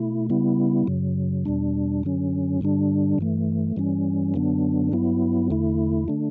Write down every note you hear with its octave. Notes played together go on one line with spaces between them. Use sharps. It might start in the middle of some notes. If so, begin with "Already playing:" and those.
Already playing: B2 A3 E4
C#3 G3 B3 E4
F#2 C#3 F#3
E2 B2 G3 D4
F#2 D3 F#3 C#4
G2 D3 G3 D4
G2 E3 A3
G2 E3 G3 C#4
F#2 D3 F#3 B3 D4
G2 F#3 B3 E4
E2 D3 A3 E4
D3 A3 D4